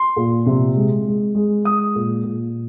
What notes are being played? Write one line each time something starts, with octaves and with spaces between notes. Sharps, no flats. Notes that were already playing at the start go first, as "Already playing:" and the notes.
Already playing: C6
A#2
C3
G#3
G#3
G#3
G#3 D#6
A#2
A#2